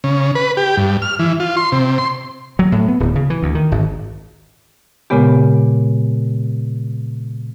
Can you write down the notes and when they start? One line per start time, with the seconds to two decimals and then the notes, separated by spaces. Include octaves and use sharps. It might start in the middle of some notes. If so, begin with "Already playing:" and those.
0.04 C#3
0.35 B4
0.57 G4
0.77 G2
1.02 F6
1.19 E3
1.40 F4
1.57 C6
1.72 C3
1.98 C6
2.59 F#3
2.72 A2
2.88 B3
3.00 D1
3.16 C#3
3.30 E3
3.43 D2
3.55 D#3
3.72 G#1
5.10 A#2 C#3 G#3 B3 G4